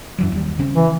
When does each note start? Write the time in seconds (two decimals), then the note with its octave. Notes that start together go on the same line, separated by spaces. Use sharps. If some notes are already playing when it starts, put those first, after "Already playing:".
0.19 F#2 E3 F#3
0.32 D#2 G3
0.59 C#3 C4 C#4
0.75 E3